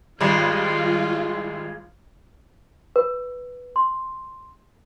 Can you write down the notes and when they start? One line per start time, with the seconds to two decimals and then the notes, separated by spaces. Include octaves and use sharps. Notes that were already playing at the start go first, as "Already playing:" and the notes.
0.21 G#1 G3 G#3 F4
2.96 B4
3.76 C6